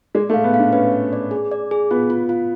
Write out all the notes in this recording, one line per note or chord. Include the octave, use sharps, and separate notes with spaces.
G#3 D5
A3
F5
B3
D4 F5
C#4 B4
B4
D5
G#4
D5
G#4
B3 F4
F4
F4